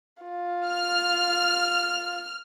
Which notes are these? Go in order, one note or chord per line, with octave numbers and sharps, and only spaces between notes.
F4
F6